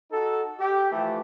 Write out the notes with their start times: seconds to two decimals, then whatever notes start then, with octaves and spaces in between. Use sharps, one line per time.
0.11 D#4 F#4 A4
0.59 G4
0.91 E3 F3 A3